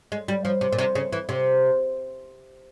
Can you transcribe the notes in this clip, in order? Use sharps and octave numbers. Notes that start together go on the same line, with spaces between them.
G#3
G3
F3
C3
A#2
C3
C#3
E3
C3